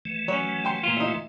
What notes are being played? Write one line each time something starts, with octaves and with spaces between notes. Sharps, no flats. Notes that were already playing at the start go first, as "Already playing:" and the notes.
E3 A3
F#3 C#4 C#5
G5 C6
A#2 F4
D#4 E4